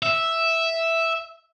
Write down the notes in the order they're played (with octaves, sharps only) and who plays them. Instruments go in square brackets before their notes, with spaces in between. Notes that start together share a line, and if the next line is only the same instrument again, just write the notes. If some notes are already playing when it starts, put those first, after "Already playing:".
[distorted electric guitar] E5